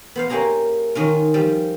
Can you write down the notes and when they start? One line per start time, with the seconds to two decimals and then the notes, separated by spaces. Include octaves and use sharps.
0.16 B3 C5 F5
0.30 A#3 C#4 G4 G#4 A#5
0.95 D#3 C#4 F4
1.34 F3 G3